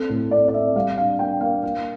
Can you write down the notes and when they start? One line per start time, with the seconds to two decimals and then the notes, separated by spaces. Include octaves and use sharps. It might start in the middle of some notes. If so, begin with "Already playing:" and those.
Already playing: C4 A4
0.10 A2
0.31 C4 D5
0.48 D5
0.54 C4 E5
0.75 G3 F5
0.98 D4 F5
1.19 A#3 G5
1.41 A#3 F5
1.63 A#3 F5